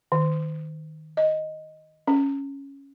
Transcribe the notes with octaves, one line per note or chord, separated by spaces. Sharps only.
D#3
D#5
C#4